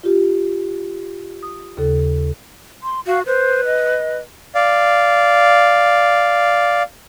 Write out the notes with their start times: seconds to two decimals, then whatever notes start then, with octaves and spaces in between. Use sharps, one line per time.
0.03 F4 G4
1.43 D#6
1.77 D#2 C#3 A4
2.83 C6
3.07 F#4 F5
3.26 B4 C5
3.65 D#5
4.55 D5 F5